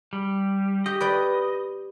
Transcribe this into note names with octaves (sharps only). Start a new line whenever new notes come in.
G3
G4 D#5
B4 D5 G5